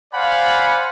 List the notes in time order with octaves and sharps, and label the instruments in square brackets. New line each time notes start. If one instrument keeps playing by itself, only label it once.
[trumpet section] C5 D5 F5 F#5 G#5 B5